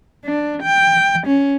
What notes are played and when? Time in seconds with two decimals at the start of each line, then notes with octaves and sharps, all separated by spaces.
0.25 D4
0.63 G5
1.27 C#4